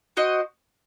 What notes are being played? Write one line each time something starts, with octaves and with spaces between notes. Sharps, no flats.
F#4 C5 D#5